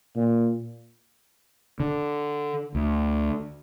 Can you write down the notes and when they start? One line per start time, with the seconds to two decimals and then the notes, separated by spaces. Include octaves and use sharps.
0.16 A#2
1.80 D3
2.75 D2